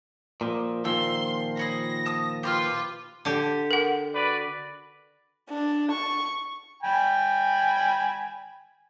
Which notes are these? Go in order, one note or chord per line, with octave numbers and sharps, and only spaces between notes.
A#2 F3
A#2 D#3 F3 C6 E6
G#4 C#5 B5 A#6
A5 D#6
F4 G4 B4 C6 F6
D3 G4
A#4 F#5
F#4 B4 D5
D4
C#6
G5 G#5 B5